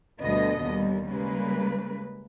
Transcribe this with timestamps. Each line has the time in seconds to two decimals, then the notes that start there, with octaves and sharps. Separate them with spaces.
0.21 D2 B2 D3 G3 B3 D#5
0.62 D#2 G3
1.06 C#3 G3 G#3 A#3 B4